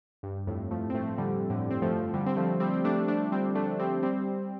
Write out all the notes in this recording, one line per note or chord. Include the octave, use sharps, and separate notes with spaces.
G2
F2 A2
F3 A3
C4
F3 A3
D3 G3
A2 D3
C4
F3 A3
D3 G3
C4
F3 A3
G3 C4
C4
A3 D4
A3 D4
G3 C4
A3 D4
G3 C4
G3 C4